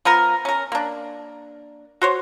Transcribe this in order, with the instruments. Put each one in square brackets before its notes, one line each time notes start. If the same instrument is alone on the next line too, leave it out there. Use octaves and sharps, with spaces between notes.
[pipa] F3 B3 A#4
C#4 A#4
A#3 D4
F#4 C5 C#5